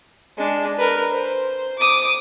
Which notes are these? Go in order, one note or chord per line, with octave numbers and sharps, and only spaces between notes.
G#3 D4
A#4 B4
C5
D6 D#6